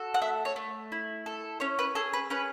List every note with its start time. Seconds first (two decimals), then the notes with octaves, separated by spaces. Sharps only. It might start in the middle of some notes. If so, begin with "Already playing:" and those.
Already playing: F#4 A4
0.14 F#5
0.21 A3 E5
0.45 C#5
0.56 A3
0.92 E4
1.26 A4
1.60 C#4 C#5
1.79 B4
1.95 G#4 A4
2.13 B4
2.30 C#4 B4